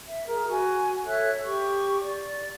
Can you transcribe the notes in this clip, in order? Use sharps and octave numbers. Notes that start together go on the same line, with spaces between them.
E5
G#4 A#4
F#4 G#5
A4 C#5 E5 F#6
G4 C#6
D5